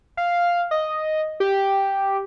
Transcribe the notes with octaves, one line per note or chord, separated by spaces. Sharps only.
F5
D#5
G4